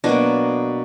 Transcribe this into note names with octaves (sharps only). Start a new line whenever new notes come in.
B2 F#3 A#3 D4